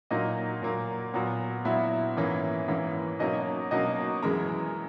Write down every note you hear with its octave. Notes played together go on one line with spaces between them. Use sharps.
A#2 F#3 A#3 D#4 D#5
A#2 F#3 A#3
A#2 F#3 B3
A#2 F#3 B3 E4 E5
G#2 E3 A#3 C#4
G#2 E3 A#3 C#4
B2 F#3 A#3 C#4 D#4 D#5
B2 F#3 A#3 C#4 D#4 D#5
F#2 E3 G#3 A#4 A#5